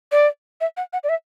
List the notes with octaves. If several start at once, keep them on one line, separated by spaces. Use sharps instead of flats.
D5
E5
F#5
F#5
D5
E5